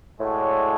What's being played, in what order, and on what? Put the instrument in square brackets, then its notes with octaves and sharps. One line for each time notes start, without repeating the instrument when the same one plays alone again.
[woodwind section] A2 [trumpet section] G#3 D4 F#4 A4 C#5